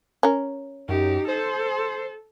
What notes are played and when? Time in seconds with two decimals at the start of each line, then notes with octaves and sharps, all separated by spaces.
0.23 C#4 A#4
0.88 F#2 D#4 G4
1.28 A4 C5